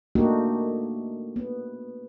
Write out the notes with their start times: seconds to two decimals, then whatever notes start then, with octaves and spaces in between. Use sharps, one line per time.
0.15 A3 A#3 D4 D#4 F#4 G4
1.36 B3